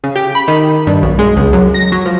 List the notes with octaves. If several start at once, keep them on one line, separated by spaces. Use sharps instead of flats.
C#3
G4
B5
D#3
G2
B1
G#3
C#2
F#2
A#6
F#3
F3